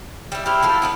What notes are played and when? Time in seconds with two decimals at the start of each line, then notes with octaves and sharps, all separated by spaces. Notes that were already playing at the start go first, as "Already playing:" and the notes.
0.32 G3 E4
0.46 C4 E4 G4 F6
0.63 F3 F#3 A4
0.82 B3 D4 B4